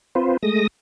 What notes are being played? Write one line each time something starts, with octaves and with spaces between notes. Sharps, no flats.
C4 F4 B4 C5
G#3 A3 D#6 A#6